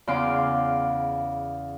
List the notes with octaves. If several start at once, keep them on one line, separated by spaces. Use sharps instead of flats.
E2 C#3 F5 C6 D6